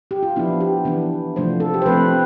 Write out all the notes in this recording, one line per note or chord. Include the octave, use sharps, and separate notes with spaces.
G4
F4
F3 B3 D4 E4
G4
E3 B3 D4
C3 F3 A3 D4 C5
A4
G4
C5
F3 A3 C4 B4